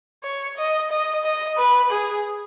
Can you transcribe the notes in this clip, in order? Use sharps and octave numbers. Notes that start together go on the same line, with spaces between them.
C#5
D#5
D#5
D#5
B4
G#4